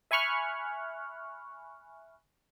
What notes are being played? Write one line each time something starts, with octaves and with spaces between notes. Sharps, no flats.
E5 G#5 B5 C#6 F6 F#6